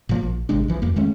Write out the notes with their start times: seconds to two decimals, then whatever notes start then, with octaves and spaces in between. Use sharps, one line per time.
0.09 A#2 F3 A#3
0.23 A#1
0.49 G#1 C3 G#3 D4
0.68 B1 E3 F3
0.82 D1 F2 A#3
0.96 D#3 G#3 A3 C#4